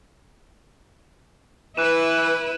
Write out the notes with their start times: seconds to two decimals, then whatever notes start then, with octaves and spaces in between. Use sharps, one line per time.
1.77 E3 E4 B4 F#6 D#7 E7